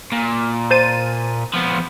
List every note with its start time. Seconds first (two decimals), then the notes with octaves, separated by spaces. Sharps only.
0.12 A#2
0.71 C5 A5 D#7
1.54 F3 B3